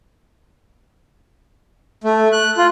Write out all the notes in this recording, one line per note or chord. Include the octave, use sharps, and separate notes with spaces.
A3
F#6
F4